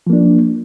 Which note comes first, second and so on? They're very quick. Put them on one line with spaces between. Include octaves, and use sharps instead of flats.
F3 A#3 D4